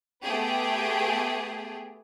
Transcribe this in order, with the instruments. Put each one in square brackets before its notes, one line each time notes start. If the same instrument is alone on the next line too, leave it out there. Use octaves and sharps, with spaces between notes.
[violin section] A3 B3 G4 G#4